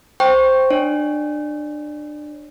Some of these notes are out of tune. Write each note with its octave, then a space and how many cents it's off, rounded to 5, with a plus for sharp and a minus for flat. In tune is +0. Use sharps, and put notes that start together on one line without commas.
C5 +0 G5 +0 C#6 +0
D4 +25 C#5 +0